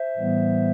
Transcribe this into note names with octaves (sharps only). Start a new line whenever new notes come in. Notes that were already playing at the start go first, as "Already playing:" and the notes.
Already playing: C5 E5
A2 E3 G3 B3